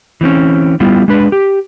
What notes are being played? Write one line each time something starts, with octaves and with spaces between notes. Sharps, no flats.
E3 C4 C#4
G3 B3 E4 F4
G#3 D4 B4
G4